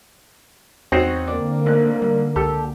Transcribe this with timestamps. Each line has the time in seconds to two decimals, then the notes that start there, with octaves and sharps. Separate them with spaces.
0.92 E2 C4 C#4 D#4 F#4
1.28 D3 A#3 D4
1.66 G#1 A3 F#6
2.02 G3
2.36 C#2 G4 A4